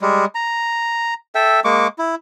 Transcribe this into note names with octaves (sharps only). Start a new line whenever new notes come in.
G3 G#3
A#5
A4 E5 G5
G#3 A#3 C#6 D6
E4